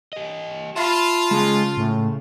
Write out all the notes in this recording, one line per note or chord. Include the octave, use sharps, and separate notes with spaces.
G4 D#5
F4 E5 A5 B5
C#3 G#3 A5
A2